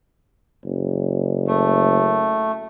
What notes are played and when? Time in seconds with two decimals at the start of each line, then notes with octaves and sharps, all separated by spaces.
0.65 F#1
1.48 A3